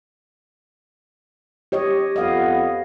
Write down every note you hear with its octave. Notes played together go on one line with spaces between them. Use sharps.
G4 C#5 D#5
F2 B3 D#5 F5